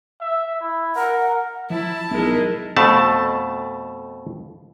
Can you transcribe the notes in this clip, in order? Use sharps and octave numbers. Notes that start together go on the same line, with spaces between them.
E5
E4
A#4 F#5
F3 E4 A5
B1 G#3 E4 A#4
F2 B2 A3 A5